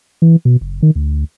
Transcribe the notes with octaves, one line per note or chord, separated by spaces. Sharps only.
E3
B2
F#1
D#3
D2